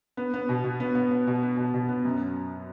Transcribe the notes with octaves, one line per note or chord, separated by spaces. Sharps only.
B3
B3
B2
B2
B3
B3
B3
B2
B3
B2
B2
B3
F#2